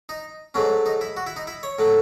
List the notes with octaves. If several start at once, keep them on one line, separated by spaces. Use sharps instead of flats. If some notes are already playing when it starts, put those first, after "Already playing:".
D#4
G#2 F#3 A3 C#4
D#4
E4
F#4
E4
D#4
E4
C#5
A2 F#3 A3